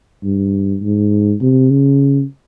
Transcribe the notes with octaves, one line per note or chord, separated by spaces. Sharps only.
G2
G#2
C3
C#3